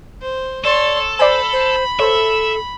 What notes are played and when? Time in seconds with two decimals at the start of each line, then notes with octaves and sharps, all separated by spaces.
0.22 C5
0.65 A4 C#5 D5 C6
1.19 C5 D5 G#5 B5
1.53 C5
1.99 A4 C5 C#5 E5